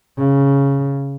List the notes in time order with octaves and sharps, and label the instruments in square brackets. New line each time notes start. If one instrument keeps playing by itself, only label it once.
[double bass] C#3